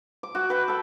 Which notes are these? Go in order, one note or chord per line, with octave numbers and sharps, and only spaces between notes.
D6
F#4 D6
B4 G5
A4 B5